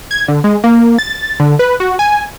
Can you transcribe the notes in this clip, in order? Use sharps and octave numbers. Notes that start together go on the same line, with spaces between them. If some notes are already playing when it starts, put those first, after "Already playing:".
G#6
D3
G#3
A#3
A6
D3
B4
F#4
G#5